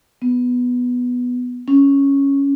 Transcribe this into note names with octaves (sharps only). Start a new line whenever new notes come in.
B3
C#4